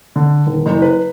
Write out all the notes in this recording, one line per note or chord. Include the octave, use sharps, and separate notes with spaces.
D3
D#1
F#1
B4